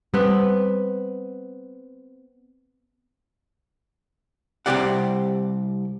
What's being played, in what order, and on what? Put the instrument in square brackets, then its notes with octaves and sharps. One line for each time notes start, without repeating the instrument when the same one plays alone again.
[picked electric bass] G3 [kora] B3 C4 B4
[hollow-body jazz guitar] C2 F2 C4 G4 D5 F#5